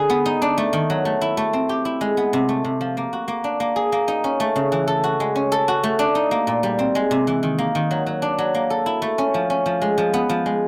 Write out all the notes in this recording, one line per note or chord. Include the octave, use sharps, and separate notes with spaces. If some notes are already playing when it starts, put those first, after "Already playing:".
Already playing: D3 G#4 B4
B3
D#4
D4
A3
D#3
F#3
A3
E4
A3
C4
G4
E4
G#3
B3
C3
A3
C3
F3
A#3
F#4
A#3
D4
A#3
G#4
A#3
D#4
C#4
A3
C#3
E3
A4
F#4
G#3
C#4
A4
F#4
A3
D4
D#4
A#3
A#2
G3
C4
G#3
C3
E3
D#3
A#3
D#3
F#3
F#3
D4
F#3
A#3
A4
E4
A3
C#4
F3
C#4
F3
G#3
F3
B3
F3
G#3